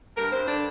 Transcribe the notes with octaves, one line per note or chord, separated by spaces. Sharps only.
G2 A#4
G2 C5
D3 D4